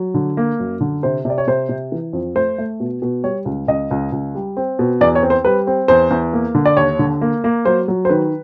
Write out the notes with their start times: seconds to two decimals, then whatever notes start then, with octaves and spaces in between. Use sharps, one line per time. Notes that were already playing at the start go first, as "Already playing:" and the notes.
Already playing: F#3
0.14 D3
0.37 A#3
0.60 F#2
0.81 D3
1.03 C3 C5
1.25 C3 D5
1.38 C#5
1.47 C3 C5
1.69 C3
1.92 E3
2.13 F2
2.36 A3 C5
2.58 A3
2.80 B2
3.02 B2
3.24 G3 C#5
3.45 C#2
3.68 C#2 D#5
3.91 C#2
4.12 C#2
4.35 G3
4.57 C4
4.79 B2
5.01 E2 D5
5.15 C#5
5.23 C4
5.30 C5
5.45 G3 B4
5.67 C4
5.88 E2 C5
6.11 E2
6.33 A#3
6.55 D3
6.65 D5
6.77 D#2 C#5
6.99 D3
7.21 A#3
7.44 A#3
7.65 F#3 C5
7.88 F#3
8.05 C5
8.09 D#3 B4